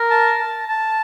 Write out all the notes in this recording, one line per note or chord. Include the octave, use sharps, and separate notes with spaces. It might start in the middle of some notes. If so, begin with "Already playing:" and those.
Already playing: A#4
A5
A5
A5